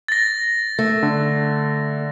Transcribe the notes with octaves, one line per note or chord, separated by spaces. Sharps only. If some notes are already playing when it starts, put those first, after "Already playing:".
A6 A#6
A3
D3